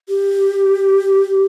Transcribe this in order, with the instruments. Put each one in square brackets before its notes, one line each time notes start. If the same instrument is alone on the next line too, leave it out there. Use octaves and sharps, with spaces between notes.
[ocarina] G4